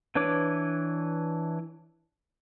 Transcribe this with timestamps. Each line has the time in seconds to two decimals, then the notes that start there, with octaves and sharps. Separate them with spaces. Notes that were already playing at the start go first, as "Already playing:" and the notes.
0.15 E3 D4 B4 C#5 D6